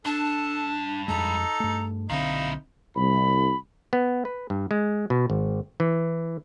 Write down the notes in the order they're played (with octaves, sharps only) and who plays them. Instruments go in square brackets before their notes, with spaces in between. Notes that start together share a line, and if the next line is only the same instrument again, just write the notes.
[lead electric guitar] G2 A5 [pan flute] D4 [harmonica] A4
[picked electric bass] F2 G#3 [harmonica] D#4 A4 [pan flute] A#5
[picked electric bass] G2 A3
[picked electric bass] B1 D3 C4 [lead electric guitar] A#2 E4 [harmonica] D#4 [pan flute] F5
[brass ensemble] C2 [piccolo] B5
[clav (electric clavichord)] B3
B4
G2
G#3
B2
G#1
E3